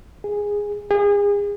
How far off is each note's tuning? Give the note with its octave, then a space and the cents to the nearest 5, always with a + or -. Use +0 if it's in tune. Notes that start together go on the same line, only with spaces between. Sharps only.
G#4 -10
G#4 -35